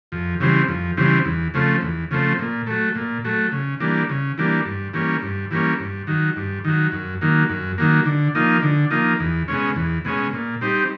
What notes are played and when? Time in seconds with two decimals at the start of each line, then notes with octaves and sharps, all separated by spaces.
0.12 F2
0.40 C#3 E3 G3 C4
0.68 F2
0.97 C#3 E3 G3 C4
1.25 E2
1.54 C#3 F3 A3 C4
1.82 E2
2.11 C#3 F3 A3 C4
2.39 A#2
2.67 F#3 A3
2.95 A#2
3.24 F#3 A3
3.52 C#3
3.80 E3 G3 A#3 D4
4.10 C#3
4.38 E3 G3 A#3 D4
4.66 G2
4.94 E3 G3 A#3 C#4
5.23 G2
5.51 E3 G3 A#3 C#4
5.80 G2
6.07 D#3 F#3
6.36 G2
6.64 D#3 F#3
6.92 F#2
7.21 D#3 F#3 A#3
7.49 F#2
7.78 D#3 F#3 A#3
8.05 D3
8.35 F3 A#3 D#4
8.62 D3
8.91 F3 A#3 D#4
9.20 E2
9.48 B2 G#3 C#4
9.76 E2
10.05 B2 G#3 C#4
10.33 A#2
10.61 G3 C4 D#4 G4